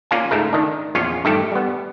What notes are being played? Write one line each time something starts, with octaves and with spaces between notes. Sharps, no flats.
A#3 C#4 F4 D5 F5 G#5
C#2 G#2 A3 A#4
D#3 D4
A#1 E2 C#4 F4 C#5 F5
G2 D#3 A3 G4 A4
G3 B3